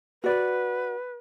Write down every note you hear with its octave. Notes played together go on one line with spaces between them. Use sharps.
F#4 B4 D5